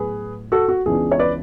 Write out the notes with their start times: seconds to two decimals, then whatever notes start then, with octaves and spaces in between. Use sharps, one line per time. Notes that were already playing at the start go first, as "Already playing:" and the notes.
Already playing: A2 F#3 B3 G#4 B4
0.52 F#4 A4
0.68 F#4
0.86 C#2 C#3 E3 B3 D4 G#4
1.12 C#5
1.19 B4 D5